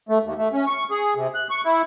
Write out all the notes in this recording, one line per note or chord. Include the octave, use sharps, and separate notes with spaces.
A3
D#2
A3
C#4
C#6
G#4
C3
F#6
C#6
E4